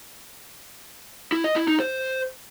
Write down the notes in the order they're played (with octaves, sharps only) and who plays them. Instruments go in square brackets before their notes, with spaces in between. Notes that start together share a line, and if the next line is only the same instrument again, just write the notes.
[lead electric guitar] E4
D#5
E4
D#4
C5